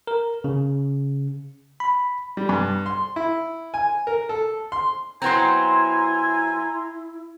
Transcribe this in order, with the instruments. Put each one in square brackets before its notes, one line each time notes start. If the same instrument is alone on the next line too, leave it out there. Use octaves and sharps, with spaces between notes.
[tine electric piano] A#4
C#3
B5
[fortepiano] G3
G2
C6
E4
G#5
A#4
A4
C6
[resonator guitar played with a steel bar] F#3 B3 C4 [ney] E4 [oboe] G#5 [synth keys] A#5 C6